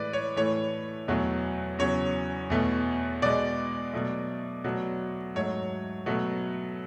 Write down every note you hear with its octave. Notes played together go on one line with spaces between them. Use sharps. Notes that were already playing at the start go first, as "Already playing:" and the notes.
Already playing: A2 E3 G#3 B4 D5
C#5
A2 E3 A3 C#5
E2 B2 F#3 A3
E2 C#3 F#3 C#5
E2 B2 A3
B2 G#3 D5
B2 F#3 A3
B2 F#3 A3
G#2 F#3 A3 C#5
B2 F#3 A3